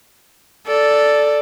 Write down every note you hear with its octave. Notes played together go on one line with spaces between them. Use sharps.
A4 D5